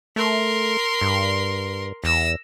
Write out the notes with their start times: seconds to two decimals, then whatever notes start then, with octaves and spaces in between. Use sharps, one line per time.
0.16 A3 A#4 C6
1.01 G2
2.04 E2 E6 A#6